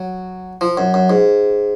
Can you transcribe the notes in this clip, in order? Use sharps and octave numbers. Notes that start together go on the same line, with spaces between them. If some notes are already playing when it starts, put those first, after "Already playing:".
Already playing: F#3
F3
F#2
F#2
G#2